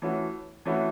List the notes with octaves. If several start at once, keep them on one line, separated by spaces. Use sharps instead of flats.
E3 A3 C#4 F#4
E3 A3 C#4 F#4